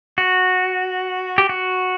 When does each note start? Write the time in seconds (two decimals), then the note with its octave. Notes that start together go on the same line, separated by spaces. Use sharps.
0.18 F#4
1.38 G4
1.49 F#4